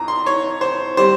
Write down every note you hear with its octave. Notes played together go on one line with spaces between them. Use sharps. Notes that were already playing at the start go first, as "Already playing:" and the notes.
Already playing: F2 A#5
C6
C#5
C5
G3 C4 C5